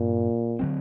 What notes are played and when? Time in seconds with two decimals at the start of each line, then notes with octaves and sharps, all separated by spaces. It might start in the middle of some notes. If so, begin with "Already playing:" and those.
Already playing: G2 A#2 F#3 C4
0.59 D3 F#3 C4